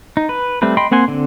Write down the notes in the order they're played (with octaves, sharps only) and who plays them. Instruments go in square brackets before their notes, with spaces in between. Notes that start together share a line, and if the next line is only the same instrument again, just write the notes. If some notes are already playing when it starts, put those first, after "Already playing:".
[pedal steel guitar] D#4
B4
G3 A3 C4 B4
D#5 G5 B5 C6
A#3 C4 F#5 G#5 C6
D3 C4